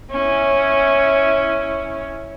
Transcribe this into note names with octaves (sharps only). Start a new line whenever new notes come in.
C#4 E4